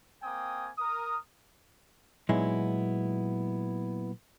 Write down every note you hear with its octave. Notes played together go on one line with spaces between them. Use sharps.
A#3 C4 G5 G#5 D#6
A#4 D#6
A#2 F#3 G#3 B3 D#4 E4